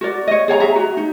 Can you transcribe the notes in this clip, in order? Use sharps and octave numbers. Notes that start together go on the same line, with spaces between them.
F#4 A#4 D5
C#5 D#5
G#4 C#5 G#5 A#5
G#4 E5 A#5
F#4
D#4